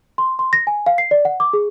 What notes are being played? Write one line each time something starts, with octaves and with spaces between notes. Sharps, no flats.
C6
C6
A#6
G#5
F5
C7
D5
F#5
D6
G#4